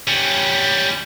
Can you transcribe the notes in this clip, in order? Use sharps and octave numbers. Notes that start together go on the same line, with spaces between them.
G3 C#4